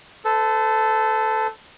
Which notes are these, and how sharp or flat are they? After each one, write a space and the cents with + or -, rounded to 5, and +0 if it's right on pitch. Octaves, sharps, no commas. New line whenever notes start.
A4 +0 C5 -45